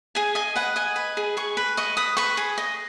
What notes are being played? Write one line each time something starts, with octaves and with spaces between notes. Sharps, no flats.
G#4 G#5
D#5 G#5
B4 F#5
D#5 G#5
B4
G#4
G#4 C#6
B4
D#5 C#6
B4 D#6
B4 C#6
G#4
D#5